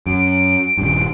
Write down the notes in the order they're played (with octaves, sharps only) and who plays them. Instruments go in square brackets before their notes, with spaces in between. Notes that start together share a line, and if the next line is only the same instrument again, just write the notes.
[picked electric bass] F#2 [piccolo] D7
[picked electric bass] D#1 G2